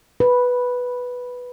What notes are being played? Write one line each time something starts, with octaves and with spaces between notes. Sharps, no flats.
B4